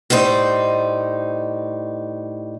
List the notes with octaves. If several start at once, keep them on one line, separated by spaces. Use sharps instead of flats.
A2 G3 D#4 C5